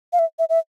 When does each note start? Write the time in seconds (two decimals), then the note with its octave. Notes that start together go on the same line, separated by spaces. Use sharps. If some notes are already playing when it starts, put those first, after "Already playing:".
0.13 F5
0.19 E5
0.39 E5
0.49 E5